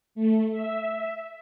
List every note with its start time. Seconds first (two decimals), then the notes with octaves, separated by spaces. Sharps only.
0.15 A3
0.51 E5